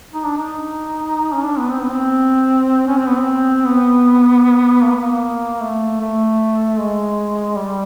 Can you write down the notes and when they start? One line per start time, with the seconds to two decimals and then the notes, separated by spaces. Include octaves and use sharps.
0.14 D#4
0.26 D4
0.37 D#4
1.33 C#4
1.44 D4
1.58 B3
1.71 C4
1.81 B3
1.91 C4
2.88 C#4
2.97 C4
3.07 B3
3.17 C4
3.66 B3
4.83 A#3
4.94 B3
5.04 A#3
5.61 A3
6.00 A3
6.79 G#3
7.56 G3